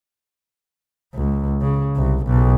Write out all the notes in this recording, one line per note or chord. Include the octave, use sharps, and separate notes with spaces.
C#2
C#3
C2
B1